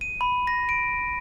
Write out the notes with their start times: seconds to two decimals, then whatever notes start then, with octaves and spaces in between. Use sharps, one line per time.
0.01 D#7
0.21 B5
0.47 A#6
0.69 D7